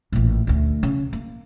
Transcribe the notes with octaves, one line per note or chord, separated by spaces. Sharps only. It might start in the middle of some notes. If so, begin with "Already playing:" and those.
A1 A#2
D2 A3
C#3
A#3